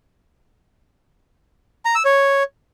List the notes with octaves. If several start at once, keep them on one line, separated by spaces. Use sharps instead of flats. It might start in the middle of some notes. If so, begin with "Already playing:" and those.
A#5
E6
C#5